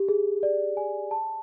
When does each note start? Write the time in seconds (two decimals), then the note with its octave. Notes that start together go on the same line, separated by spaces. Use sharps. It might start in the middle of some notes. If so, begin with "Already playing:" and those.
Already playing: G4
0.08 G#4
0.43 D5
0.77 G#5
1.11 A5